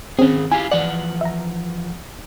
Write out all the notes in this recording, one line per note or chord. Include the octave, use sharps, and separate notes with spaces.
D#3 C4 C#4 G#4
E4 F4 G4 G#5
E3 F3 D5 F#5
E5 A#5